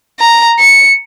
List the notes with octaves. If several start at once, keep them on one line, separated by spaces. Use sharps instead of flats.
A#5
C#7